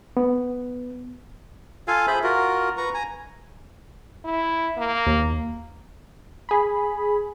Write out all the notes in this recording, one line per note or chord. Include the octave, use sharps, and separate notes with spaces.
B3
F4 A4 F5 G#5
G#4 C5 E5 B5
F4 F#4 A#4
B4 A#5 C#6
G#5 A#5
E4
A#3
D#2
G#4 B5